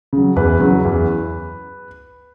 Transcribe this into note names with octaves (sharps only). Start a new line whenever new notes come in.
C#3 F#3
E2 B4
C#3 F#3
E2